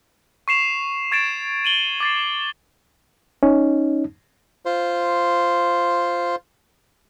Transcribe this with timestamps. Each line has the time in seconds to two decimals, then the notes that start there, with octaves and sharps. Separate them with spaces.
0.48 C#6 C7 E7 F7
1.12 C#6 G#6 A6 C7 D7 E7
1.65 D#7 F#7 G7
2.00 D6 A6 C7
3.43 C#4 D#4
4.66 F4 C5